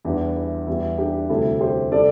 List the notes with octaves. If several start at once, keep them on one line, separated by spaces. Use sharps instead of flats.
E2 E3 G3 D4
E4
E2 E3 G3 E4
D4 G4
D2 C3 G3 E4 A4
G4 C5
C3 G3 A4 D5